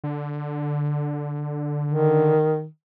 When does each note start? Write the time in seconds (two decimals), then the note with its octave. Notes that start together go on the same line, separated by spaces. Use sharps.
0.04 D3
1.88 D#3